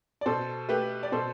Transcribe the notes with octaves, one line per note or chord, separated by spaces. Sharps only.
D5
B2 A4 C5
A3 G4 B4
D5
B2 A4 C5